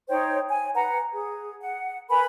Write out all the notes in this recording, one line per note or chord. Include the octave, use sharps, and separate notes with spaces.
D#4 C5 C#5 G5
G#5
B4 F#5 A#5
G#4
F#5
A#4 B4 G#5 B5